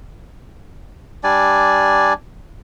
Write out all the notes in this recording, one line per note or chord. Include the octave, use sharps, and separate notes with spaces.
G3 D4 D5 G#5